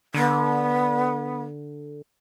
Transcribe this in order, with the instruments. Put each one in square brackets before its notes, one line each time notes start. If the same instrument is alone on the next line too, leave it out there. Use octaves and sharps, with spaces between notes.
[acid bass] D3 [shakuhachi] B3